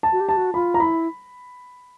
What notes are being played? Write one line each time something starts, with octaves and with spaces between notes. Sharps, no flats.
A5
F#4
G4
A5
F#4
F4 B5
A#5
E4 B5